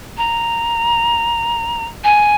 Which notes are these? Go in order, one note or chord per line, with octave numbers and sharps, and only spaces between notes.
A#5
G#5